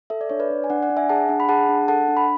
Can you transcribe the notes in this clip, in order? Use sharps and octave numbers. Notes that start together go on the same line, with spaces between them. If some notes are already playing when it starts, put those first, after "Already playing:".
A4 E5
D5
D4 C#5
B4 D5
D4
G#5
D4 D5 F#5
D5 F#5
D4
E5 G#5
G#4 F#5 A5
D4
B5
G#4 F#5 A5
D4
A4 F#5 A5
D4
B5